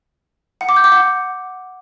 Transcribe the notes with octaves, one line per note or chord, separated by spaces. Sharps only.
F#5
D6
G6
D6
F#5